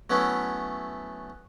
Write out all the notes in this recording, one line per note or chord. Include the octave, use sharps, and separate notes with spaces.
F#3 A3 B3 C#4 E4